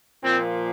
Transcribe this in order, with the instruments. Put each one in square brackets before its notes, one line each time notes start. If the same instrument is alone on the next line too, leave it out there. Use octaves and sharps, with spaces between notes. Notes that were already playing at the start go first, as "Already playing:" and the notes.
[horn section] A#2 F3 C4